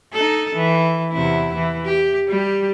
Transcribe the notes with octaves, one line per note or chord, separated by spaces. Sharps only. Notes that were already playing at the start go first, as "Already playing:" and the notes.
D#4 A4
E3
E2 C3 E4
E3
G4
G3 G4